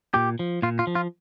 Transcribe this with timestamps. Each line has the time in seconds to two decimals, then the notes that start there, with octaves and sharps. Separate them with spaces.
0.14 A#2 G4
0.39 F3
0.62 A#2 F4
0.79 F4
0.87 F3
0.95 F4